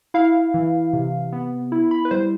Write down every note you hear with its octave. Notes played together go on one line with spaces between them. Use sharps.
E4 F5
E3
C3
B3
E4
B5
B4
G3 C5